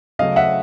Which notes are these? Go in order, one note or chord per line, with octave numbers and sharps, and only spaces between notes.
C#3 F#3 A3 D#5 F5
E5 F#5